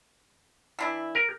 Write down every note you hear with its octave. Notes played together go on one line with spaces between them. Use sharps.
E3 D4 E4
A#4